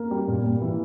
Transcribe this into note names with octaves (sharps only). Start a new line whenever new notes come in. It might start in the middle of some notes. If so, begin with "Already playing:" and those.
Already playing: A#3
G3
A#2
A#2
E3